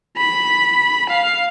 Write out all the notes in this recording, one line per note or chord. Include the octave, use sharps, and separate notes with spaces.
B5
F5